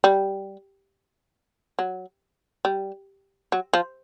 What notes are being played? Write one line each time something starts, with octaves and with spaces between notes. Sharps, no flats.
G3
F#3
G3
F#3
F3